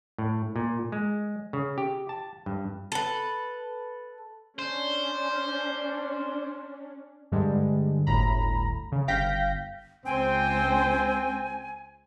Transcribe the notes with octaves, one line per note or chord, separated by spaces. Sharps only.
A2
A#2
G#3
C#3
G4
A5
G2
A4 B4
C#4 D4 C5
G2 D3 G3 G#3
G1 D2 A2 A#5 B5
C#3
G1 F5 G5 G6 A#6 B6
C#2 C4 C5 G5 G#5